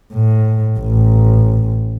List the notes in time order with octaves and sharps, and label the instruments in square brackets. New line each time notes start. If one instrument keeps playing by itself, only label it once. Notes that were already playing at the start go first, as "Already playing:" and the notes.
[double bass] A2
A1